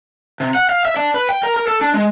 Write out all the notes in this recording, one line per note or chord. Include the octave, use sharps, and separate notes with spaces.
C3
F#5
F5
E5
D4
B4
G5
A#4
A#4
A4
D4
G#3